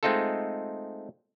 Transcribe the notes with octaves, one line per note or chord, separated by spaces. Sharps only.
G#3 A3 C4 D#4 F4 A4